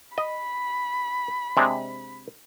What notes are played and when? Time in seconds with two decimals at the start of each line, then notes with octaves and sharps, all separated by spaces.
0.18 D#5 B5
1.57 C3 G#3 D4